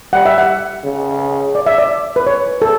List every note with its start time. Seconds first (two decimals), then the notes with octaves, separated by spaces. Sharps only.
0.13 G3 F#5
0.26 E5
0.38 F#5
0.85 C#3
1.55 D5
1.66 E5
1.78 D5
2.16 B4
2.27 C#5
2.62 A4